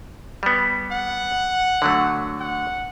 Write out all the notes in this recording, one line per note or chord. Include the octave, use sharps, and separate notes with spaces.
G3 B3
F#5
D3 F#3 A3
F#5